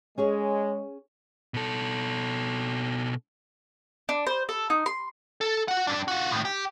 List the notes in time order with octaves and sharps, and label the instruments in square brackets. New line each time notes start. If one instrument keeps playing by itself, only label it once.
[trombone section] G#3 [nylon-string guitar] C#4 G#4 C#5
[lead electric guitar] B2 A4
[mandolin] D4
C5
A4
D#4
C6
[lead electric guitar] A4
F#4 F#5
G2 D4
F4 F#4
A2 D#3
G4